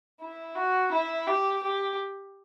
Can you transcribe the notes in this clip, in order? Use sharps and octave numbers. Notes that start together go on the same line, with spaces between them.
E4
F#4
E4
G4
G4